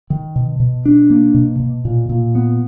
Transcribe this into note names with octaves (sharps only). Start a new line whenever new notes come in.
D#3
B2
B2
D4
A#3
B2
B2
A#2
A#2
B3